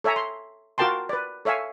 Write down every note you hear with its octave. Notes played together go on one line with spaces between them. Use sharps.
A4 C#5 E5 G#5 A#5
C6
F4 F#4 A#4 G5 A5 C6
B4 D5
A4 C#5 E5 F5 G#5